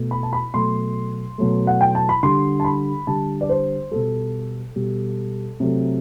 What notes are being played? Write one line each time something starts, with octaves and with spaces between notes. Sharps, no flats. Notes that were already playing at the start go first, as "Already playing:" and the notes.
Already playing: B2 A3
B5
A5
B5
B2 F#3 A3 C6
B2 F#3 A3
F#5
G5
A5
B5
D3 G3 C6
A5
B5
D3 G3 A5
D5
C5
B2 G3 A4
B2 G3
C3 F#3 A3